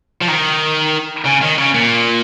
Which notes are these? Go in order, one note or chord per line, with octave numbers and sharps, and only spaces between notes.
F3
D#3
C#3
D#3
C#3
A#2